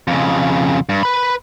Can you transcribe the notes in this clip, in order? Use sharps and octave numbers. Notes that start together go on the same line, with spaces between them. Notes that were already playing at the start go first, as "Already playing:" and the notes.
F2 C#3
G2
B4 B5